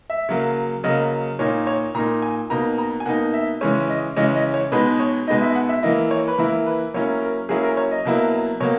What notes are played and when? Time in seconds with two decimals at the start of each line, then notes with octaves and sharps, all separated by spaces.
0.10 E5
0.29 C#3 F#3 A#3
0.84 C#3 F#3 A#3 D#5
1.39 A#2 A#3 D#4 C#5
1.67 C#5
1.95 A#2 A#3 D#4 A#5
2.22 G#5
2.50 B2 A#3 D#4 A#5
2.78 A#5
3.00 G#5
3.06 B2 A#3 D#4 F#5
3.34 E5
3.61 C#3 E3 G#3 C#4 C#5
3.89 D#5
4.17 C#3 E3 G#3 C#4 D#5
4.35 D#5
4.54 C#5
4.72 B2 G#3 B3 D#4 B4
5.00 C#5
5.27 B2 G#3 B3 D#4 D#5
5.41 E5
5.55 F#5
5.69 E5
5.83 E3 A#3 E4 D#5
6.11 C#5
6.27 B4
6.38 E3 A#3 E4 A#4
6.67 B4
6.94 F#3 A#3 C#4 E4 C#5
7.21 A#4
7.49 F#3 A#3 C#4 E4 G#4
7.63 A#4
7.77 C#5
7.91 D#5
8.05 B2 F#3 A#3 E4
8.60 B2 F#3 A#3 C#5